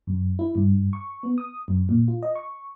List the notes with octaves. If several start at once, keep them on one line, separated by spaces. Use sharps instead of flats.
F#2
E4
G2
C#6
B3
D#6
F#2
A#2
F4
D#5
C#6